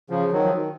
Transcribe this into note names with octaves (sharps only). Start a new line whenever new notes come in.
C#3 F3
D#3 F#3
F3
D#3